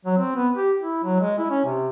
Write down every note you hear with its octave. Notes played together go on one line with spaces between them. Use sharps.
F#3
C4
B3
G4
E4
F#3
G#3
E4
C#4
C3